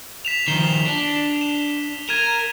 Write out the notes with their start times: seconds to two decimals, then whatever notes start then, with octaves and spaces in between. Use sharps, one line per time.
0.25 B6 E7 F7
0.48 D#3 F3 C7 E7 G7
0.86 D4
1.41 E7
2.09 A#4 G#6 D#7 E7